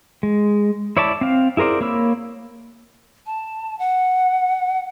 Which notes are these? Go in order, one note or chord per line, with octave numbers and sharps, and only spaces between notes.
G#3
E4 C#5 D5 E5 A5
C4 F5
E4 G#4 A#4 C5 D5
A#3 C#5 B5 E6
A5
F#5